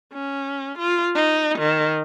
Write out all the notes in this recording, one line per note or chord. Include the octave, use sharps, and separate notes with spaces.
C#4
F4
D#4
D#3